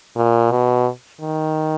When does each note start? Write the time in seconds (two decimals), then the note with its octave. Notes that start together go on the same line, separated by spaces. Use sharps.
0.16 A#2
0.51 B2
1.21 D#3